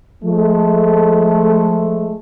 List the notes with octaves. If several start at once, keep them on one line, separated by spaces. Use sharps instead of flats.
F3 G#3 A3